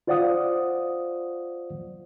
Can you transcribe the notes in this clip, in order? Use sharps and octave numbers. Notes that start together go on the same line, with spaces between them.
F4 C5 D5 F5 F#5 D#6